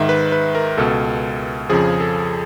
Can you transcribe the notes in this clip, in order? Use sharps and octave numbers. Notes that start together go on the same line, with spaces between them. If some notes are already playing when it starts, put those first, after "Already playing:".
Already playing: G#2 D#3 E5
B4
B4
A#4
C#2 B2 A4
F2 C#3 F3 G#4
A4